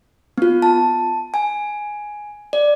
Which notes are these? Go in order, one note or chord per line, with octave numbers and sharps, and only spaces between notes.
B3 F4
A5
G#5
D5